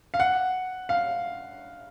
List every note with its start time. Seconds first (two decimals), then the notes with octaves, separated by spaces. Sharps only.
0.14 F5
0.20 F#5
0.89 F5